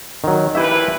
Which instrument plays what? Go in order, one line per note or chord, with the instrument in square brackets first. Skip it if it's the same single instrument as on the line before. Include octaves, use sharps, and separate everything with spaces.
[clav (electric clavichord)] D#3 F#3
[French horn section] A#2 F3 B4 [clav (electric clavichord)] E4 G4 E5